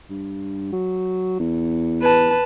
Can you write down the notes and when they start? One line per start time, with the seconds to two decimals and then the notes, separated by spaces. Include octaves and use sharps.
0.10 G2
0.72 F#3
1.40 E2
2.02 B4 A5